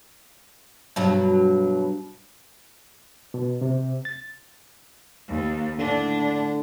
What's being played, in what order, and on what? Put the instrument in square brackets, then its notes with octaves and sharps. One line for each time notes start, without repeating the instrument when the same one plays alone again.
[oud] G2 B2 F#3
[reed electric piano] B2
C3
A6
[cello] D#2
[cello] A2 D4 [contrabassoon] D3